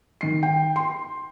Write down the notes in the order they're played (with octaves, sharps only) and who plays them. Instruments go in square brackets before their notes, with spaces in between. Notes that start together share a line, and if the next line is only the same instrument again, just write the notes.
[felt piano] D#3 C7
G5
C6